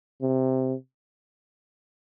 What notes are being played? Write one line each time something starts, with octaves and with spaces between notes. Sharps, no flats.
C3